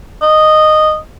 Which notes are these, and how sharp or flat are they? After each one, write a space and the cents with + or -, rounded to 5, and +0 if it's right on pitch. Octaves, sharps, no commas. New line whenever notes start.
D#5 -10